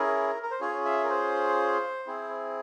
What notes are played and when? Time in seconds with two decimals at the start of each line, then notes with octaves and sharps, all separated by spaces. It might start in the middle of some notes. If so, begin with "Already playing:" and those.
Already playing: C#4 E4 G#4 A#4
0.42 A#4
0.51 C5
0.61 C#4 F4 G#4 C#5
0.85 E5
1.04 A#4
1.10 C5
2.07 C4 E4 G#4